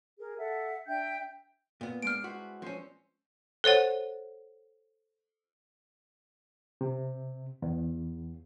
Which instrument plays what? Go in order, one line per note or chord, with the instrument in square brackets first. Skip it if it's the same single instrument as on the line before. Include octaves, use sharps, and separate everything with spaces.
[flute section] G#4 A#4
A4 E5 F#5
D4 E5 G5 G6
[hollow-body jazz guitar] A#2 B3
[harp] G#3 C4 D4 [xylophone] F6 D7
[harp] E4 B4 C5 [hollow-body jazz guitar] F#4
[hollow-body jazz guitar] F3 C#4 [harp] C4 C5 E5
[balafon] A4 C5 C#5 F#5
[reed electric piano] C3
E2